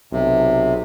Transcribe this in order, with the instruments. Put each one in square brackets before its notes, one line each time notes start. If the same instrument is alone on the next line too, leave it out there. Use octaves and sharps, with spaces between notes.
[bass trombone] B1 [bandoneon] C3